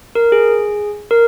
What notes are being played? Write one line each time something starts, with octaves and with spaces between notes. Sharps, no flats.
A#4
G#4
A#4